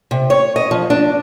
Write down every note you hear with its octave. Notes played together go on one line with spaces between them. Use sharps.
C3
C#5
D#5
F3
D4